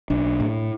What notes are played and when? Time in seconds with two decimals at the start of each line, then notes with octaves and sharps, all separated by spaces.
0.10 B1 D4
0.40 A2